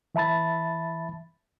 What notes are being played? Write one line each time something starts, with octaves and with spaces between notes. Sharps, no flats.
E3 E5 A5 B5 A6